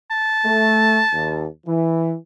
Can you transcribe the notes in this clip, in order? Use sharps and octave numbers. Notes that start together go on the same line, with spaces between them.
A5
A3
D#2
E3